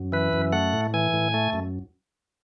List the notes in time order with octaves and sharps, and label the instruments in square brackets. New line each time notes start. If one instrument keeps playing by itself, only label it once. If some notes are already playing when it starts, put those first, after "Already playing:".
Already playing: [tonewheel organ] F#2
E3 B4
F#2
A3 F#5
A2
E3 G#5
A2
A3
F#2